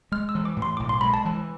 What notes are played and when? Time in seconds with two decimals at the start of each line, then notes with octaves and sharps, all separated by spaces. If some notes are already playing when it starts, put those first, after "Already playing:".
0.12 G#3 F6
0.29 E6
0.35 E3
0.45 D6
0.57 A2
0.62 C6
0.77 B1 D6
0.89 C6
1.01 G#3 B5
1.14 A5
1.25 E3